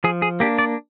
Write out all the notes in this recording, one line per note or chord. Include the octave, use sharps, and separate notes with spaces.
F3 G#4
G#4
A#3 D4 G4
D5